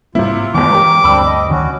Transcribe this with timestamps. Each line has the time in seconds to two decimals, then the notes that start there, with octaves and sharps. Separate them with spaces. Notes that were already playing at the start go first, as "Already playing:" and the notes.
0.15 G#2 C3 G3 A#3 E4 F4
0.54 G1 E2 D#3 G#3 B3 D6
0.70 E3 G#3 G4 A#4 C#5
1.04 D2 G2 C4 D4 B5 E6
1.25 D#5
1.48 D2 D#3 C#4 F#4